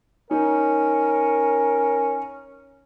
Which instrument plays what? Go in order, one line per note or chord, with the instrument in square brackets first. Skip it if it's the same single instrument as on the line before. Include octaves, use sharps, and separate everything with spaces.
[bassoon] C#4 [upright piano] D#4 [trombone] A#4